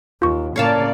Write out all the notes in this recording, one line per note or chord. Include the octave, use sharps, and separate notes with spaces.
D#2 F4 C#6
A2 C#3 A#3 C#5 D5 F5 A5